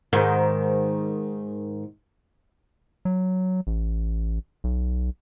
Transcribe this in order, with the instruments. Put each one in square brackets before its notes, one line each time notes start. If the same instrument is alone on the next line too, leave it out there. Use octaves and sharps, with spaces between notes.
[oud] G#2 D#3
[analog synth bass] F#3
A1
B1